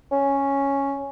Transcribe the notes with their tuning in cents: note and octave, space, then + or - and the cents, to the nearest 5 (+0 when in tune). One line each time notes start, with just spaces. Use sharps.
C#4 +0